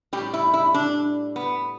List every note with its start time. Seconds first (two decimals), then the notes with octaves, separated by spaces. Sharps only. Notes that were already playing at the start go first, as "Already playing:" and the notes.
0.13 A2 G3 G4
0.34 E4
0.54 E4
0.74 D4
1.36 B3